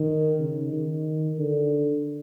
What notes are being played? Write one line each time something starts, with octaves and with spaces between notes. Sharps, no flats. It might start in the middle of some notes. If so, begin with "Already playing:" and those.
Already playing: D#3
C#3
D#3
D3